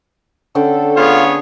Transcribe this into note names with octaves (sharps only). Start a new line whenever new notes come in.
D3 C#4 A4 G5
B3 F4 G#4 C#5 F5